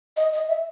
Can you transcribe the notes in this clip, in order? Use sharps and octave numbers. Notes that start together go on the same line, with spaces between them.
D#5
D#5
E5